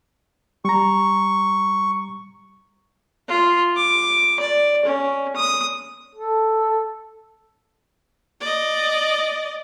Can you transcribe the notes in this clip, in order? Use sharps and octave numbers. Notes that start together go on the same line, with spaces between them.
G3 A#5 C#6
F4
D6
D5
C#4
D#6
A4
D5 D#5